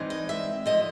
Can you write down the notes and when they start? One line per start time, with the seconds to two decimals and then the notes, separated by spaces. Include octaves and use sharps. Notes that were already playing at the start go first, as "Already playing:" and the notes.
Already playing: G2 E3 G#3 C4 D#4
0.10 D#5
0.29 E5
0.66 D3 F3 D#5